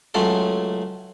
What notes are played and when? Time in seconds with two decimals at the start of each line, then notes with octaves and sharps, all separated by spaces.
0.14 C#2 F#3 A3 C#4 A4 C6